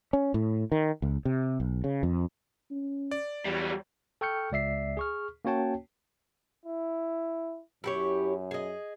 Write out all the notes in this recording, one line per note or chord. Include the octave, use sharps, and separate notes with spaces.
C#4
A2
D#3
C#2
C3
B1
C#3
F2
C#4
D5
E2 F#3 G3
A4 G5 C#6 F6 G6 C#7
C#2 D5 E5 C7
G#4 C#6 F6
A#3 C#4 F#4 C#5 G5 A5
E4
F#2 E4 G4 C#5
G#4 D#5